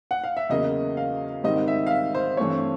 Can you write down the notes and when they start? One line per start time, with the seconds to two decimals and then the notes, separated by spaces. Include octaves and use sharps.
0.11 F#5
0.24 F5
0.37 E5
0.49 E2 C#3 F#3 A#3 D#5
0.97 F5
1.43 G#2 D#3 G3 C4 D#5
1.68 E5
1.87 F5
1.91 E5
2.15 C5
2.37 G2 E3 A3 C4 C#5